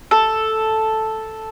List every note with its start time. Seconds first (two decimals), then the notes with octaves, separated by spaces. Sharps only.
0.11 A4